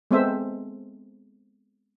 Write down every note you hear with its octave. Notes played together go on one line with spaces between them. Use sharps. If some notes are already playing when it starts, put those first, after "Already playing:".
G#3 B3 C4 A4 C5 E5